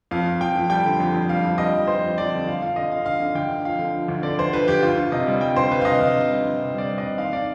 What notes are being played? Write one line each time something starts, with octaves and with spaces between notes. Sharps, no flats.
F2 F5
F2
F2 G5
F2
G3 G5
D3
F2
F2
G3 F5
F2
G3 D#5
F2
F2 C5
F2
F2 D5
D3
D2 F5
F3 F5
D3 D#5
D3 F5
D2 F5
D3
D2 G5
D2
F3 F5
D3
F3
D2
D3 D5
D2 C5
F3 B4
D2 G4
D2 F4
D2
C3 D#5
G3
G3 G5
D2 C5
D2 B4
F5
C3 D#5
D2 F5
C3
G3
D2
C3
G3 D5
G3
D#5
C3
D#2 F5
D#3 D5